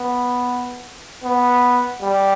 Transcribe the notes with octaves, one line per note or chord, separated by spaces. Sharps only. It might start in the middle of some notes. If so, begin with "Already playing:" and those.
Already playing: B3
B3
G3